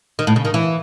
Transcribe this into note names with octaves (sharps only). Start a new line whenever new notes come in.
D#3
A2
C#3
D#3
E3